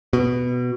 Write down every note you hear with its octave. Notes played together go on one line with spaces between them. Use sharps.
B2